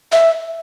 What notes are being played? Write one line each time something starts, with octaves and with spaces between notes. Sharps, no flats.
E5